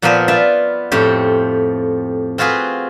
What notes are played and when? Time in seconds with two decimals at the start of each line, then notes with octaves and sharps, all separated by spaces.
0.02 A#2 F3 A#3 B3 B4 C5
0.28 F4 B4 D5 E5
0.92 F2 A2 C4 G4
2.38 C4 F4 F#4 G#4 B4